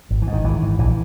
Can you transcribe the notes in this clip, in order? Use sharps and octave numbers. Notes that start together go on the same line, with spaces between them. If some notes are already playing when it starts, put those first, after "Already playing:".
G#1
E3
G#2
D#3
G#1 E3
G#2
A#1 E3